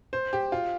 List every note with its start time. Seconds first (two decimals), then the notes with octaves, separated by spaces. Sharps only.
0.13 C5
0.33 G4
0.52 F4